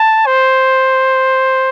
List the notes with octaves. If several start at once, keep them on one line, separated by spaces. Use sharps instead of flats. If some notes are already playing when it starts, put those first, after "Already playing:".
Already playing: A5
C5